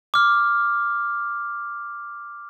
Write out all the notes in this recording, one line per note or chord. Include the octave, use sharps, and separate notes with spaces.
D6 F6